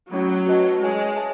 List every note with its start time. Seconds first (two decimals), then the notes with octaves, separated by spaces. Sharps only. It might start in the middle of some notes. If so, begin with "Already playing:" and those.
0.11 F#3 A3 C#4 E4
0.46 F#4 B4 D#5 A5
0.81 G#3 E4 G#4 C#5 G#5
1.16 G#4 C#5 E5 A5